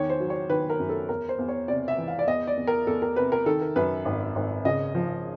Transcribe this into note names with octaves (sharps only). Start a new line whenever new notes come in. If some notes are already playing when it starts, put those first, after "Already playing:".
Already playing: E2 D#3 C#5
C5
F#3
C#5
D#3 B4
A#4
F#2
A4
E2 A#4
C5
E2
C#5
C3 D5
E5
E3
F5
D5
E2 D#5
D5
E2
A#4
E2 A4
A#4
C3 B4
A#4
D#3 A4
A#4
F#2 B4
G#1
G#1
C#3 D#5
F3